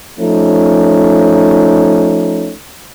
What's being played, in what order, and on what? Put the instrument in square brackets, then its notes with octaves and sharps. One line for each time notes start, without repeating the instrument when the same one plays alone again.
[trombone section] F3 A3 C#4 D#4